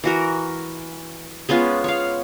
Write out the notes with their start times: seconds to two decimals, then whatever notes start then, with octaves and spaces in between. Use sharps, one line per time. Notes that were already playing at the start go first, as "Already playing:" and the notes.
0.04 E3 F#4 A#4
1.49 G#3 B3 C#4 F4
1.84 C#5 F5